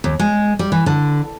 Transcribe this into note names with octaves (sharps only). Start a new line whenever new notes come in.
D#2
G#3
G3
E3
D3